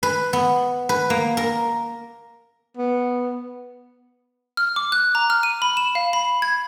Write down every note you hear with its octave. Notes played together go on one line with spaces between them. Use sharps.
B4
B3
B4
A#3
A#4
B3
F6
D6
F#6
A#5
F6
D#7
B5
E7
F5
B5
G#6